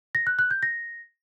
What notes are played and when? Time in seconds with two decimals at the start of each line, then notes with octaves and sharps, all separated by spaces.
0.15 A#6
0.27 F#6
0.39 F#6
0.51 G6
0.63 A#6